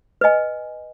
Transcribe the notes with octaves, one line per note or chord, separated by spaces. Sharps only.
B4 D#5 G#5